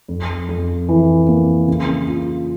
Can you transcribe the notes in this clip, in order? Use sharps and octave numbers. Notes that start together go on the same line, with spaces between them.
F2
F2
E3
A#3
C#3
F4